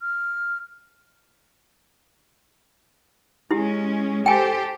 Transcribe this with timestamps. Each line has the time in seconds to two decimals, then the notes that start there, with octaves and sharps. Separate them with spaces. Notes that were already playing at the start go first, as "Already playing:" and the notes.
0.01 F6
3.51 G#3 C#4 E4 G4
4.26 G4 A4 C5 G5 G#5